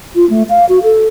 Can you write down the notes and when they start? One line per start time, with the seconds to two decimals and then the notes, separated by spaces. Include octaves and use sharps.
0.15 F4
0.30 A3
0.49 F5
0.69 F#4
0.83 A4